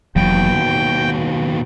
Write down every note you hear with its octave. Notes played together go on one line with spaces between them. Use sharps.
F1 D#2 B2 E3 F#3 G5
D#3